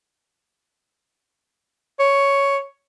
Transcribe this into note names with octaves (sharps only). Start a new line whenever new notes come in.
C#5